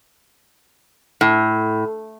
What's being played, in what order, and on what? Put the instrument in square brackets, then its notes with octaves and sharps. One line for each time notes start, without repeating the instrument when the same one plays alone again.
[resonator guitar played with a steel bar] A2